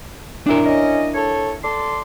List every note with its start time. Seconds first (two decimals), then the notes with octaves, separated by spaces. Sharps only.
0.46 D#2 A#2 D4 E4 A#4
0.65 C#4 D#5
1.14 A4 C#5
1.64 A4 D5 C6